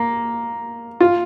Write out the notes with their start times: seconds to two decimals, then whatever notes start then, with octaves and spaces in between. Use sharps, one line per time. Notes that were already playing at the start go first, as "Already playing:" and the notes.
Already playing: A#3
1.00 F4